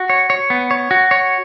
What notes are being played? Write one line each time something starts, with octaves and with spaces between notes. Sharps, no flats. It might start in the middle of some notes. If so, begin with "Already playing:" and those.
Already playing: F#4
C#5
C#5
B3
C#5
F#4
C#5